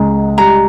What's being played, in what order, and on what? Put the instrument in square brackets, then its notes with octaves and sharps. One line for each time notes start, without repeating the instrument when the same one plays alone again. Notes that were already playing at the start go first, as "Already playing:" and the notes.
Already playing: [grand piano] C#2 G#3 [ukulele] A#5
[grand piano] G3 [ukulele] A#5